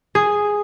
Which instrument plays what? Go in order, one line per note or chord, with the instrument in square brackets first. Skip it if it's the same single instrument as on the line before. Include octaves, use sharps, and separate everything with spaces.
[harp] G#4